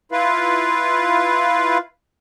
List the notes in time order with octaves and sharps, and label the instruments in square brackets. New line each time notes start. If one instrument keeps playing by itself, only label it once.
[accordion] E4 F4 B4 F5